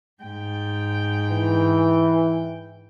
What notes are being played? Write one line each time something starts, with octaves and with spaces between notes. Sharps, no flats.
G#2 G5
E3